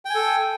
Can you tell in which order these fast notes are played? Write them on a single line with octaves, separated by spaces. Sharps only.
G5 G#5 A4